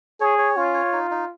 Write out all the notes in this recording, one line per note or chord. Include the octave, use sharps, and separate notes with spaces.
G#4 C#5
C#5
C#4 F4
C#5
D#4
D#4